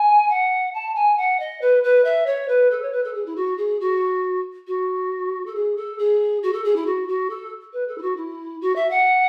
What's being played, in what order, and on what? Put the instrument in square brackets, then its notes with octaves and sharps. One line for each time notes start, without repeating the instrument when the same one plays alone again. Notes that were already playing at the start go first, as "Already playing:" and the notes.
Already playing: [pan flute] G#5
F#5
A5
G#5
F#5
D#5
B4
B4
E5
C#5
B4
A4
C#5
B4
A4
G#4
E4
F#4
G#4
F#4
F#4
A4
G#4
A4
G#4
F#4
A4
G#4
E4
F#4
F#4
A4
B4
A4
E4
F#4
E4
F#4
E5
F#5